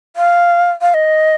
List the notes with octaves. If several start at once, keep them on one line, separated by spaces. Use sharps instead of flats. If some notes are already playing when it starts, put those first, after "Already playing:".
F5
F5
D#5